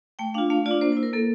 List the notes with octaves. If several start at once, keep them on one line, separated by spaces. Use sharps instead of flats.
A3 G5
D4 F4 F5
A3 F5
F4 D5
D4
A#3 C5
C5
E4
A#4
A#3 A4